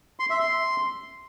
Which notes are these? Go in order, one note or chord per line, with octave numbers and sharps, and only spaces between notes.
C6
E5
C6